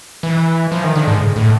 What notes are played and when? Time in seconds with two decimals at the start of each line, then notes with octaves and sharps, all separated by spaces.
0.23 E3
0.72 F3
0.84 D#3
0.96 D3
1.07 G#2
1.36 A2